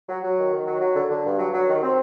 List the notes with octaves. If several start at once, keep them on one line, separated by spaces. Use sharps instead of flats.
F#3
F#3
D#3
D#3
F#3
F#3
D3
D3
G2
F#3
F#3
D#3
C4